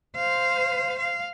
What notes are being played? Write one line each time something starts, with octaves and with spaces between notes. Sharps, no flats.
C5 F5
F5